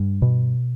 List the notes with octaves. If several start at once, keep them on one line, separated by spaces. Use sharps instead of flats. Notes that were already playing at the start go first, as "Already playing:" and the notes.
Already playing: G2
B2